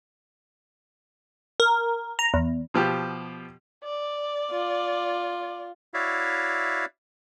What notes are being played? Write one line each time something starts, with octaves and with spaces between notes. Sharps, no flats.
A#4
A#5
E2
B2 F3 G4
D5
F4
E4 F#4 C#5 D5 E5 F5